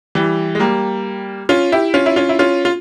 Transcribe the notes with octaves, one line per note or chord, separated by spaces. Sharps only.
E3 G3
G#3
G3 A#3
C#4 F4
E4 G4
C#4 F4
E4
C#4 F4
E4
C#4 F4
F4